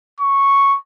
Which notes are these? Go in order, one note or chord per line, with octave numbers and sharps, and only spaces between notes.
C#6